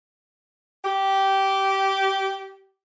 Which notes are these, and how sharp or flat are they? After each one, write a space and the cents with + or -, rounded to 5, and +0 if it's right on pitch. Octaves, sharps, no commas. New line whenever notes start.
G4 -15